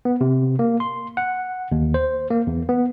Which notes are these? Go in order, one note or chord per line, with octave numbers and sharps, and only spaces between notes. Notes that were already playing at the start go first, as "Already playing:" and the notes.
B3
C3
A#3
C6
F#5
D#2
C5
A#3
E2
B3